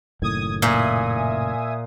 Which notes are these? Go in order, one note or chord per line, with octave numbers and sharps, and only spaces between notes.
F#1 A2 D#3 D#6 G#6
A#2 E5 G#5 D#6